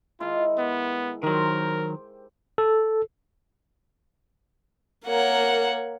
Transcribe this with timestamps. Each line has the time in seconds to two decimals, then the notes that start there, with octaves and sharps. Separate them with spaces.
0.20 D#3 G#3 E4 F4
0.58 B3
1.23 D#3 F#3 G4 A#4 C5
2.58 A4
5.06 A#3 A#4 C#5 F#5